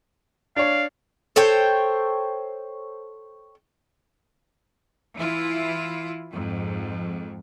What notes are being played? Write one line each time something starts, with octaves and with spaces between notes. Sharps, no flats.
D4 C#5 F5
A4 C5 C#5 G5
E3 E4 F4
F2 G#2